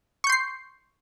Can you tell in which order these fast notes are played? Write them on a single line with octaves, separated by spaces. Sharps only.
C#6 G6 C6 C7